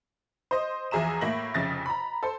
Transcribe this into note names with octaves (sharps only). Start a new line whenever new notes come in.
C5 D#5
E2 F3 G#4 E5 A#5 E7
A2 A#3 E5 A#6 F#7
F1 F2 C#3 A6 A#6
A#5 B5
A4 C5